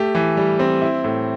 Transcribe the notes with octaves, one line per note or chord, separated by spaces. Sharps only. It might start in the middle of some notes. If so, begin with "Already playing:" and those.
Already playing: A3 G4
E3
G3
C4
E4
A2